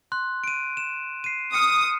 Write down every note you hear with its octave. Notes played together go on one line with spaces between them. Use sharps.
C6 F#6
D7 D#7
E7
C7 D#7
D#6 F6 C#7 D#7